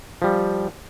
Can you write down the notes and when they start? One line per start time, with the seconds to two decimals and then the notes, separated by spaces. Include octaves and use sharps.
0.22 F3 G3